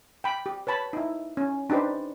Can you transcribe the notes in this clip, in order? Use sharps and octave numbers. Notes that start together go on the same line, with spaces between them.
G5 B5
G4
B4 C#5 A5 B5
D#4 E4
C#4
D4 D#4 G4 B4 C5